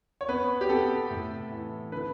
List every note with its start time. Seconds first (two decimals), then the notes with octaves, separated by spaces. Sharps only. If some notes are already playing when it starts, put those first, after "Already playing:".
0.21 C#5
0.29 B3 B4
0.61 G4
0.69 B3 A4
1.10 A2
1.51 E3
1.92 D3 B4